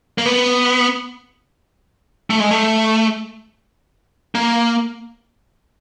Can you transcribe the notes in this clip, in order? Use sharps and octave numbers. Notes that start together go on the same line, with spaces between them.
A#3
B3
A3
G#3
A3
A#3